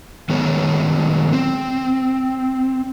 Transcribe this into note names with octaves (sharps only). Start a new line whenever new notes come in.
D#3 F#3 G#3 B3 C#5
C4